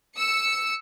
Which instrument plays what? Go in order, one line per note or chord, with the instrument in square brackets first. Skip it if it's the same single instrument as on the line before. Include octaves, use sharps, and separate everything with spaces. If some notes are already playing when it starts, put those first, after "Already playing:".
[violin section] E6 C#7